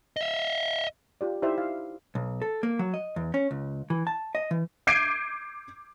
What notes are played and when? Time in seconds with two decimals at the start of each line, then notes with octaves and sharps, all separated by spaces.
0.16 D#5 E5
1.21 F4 G4 D5
1.42 D#4 E4 G4 C5 D5 E5
1.58 F5
2.15 B1
2.42 A4
2.63 A#3
2.79 F#3
2.94 D#5
3.16 E2
3.34 C#4
3.51 C#2
3.90 E3
4.07 A5
4.35 D#5
4.51 E3
4.87 D6 G6 G#6 C7 D7 D#7